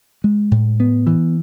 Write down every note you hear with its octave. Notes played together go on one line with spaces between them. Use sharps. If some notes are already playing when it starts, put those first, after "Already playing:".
G#3
A2
B3
E3